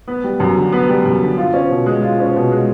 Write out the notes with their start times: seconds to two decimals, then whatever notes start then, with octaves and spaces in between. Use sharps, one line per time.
0.08 B3
0.24 G3
0.40 F#2
0.57 D3
0.72 B3
0.89 G3
1.05 F#2
1.22 D3
1.38 F4
1.54 C#4
1.70 B2
1.86 G#3
2.03 F4
2.20 C#4
2.36 B2
2.51 G#3